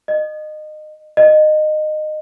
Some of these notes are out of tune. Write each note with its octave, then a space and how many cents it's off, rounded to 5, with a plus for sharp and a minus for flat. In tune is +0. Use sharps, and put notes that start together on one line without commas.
D#5 -25
D#5 -20